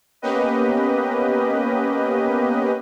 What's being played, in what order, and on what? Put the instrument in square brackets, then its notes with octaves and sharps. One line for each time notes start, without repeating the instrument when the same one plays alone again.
[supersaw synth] A#3 B3 C#4 G4 B4 D#5